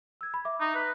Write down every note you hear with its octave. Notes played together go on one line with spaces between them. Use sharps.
E6 G#6
B5
E5 D6
D#4
B4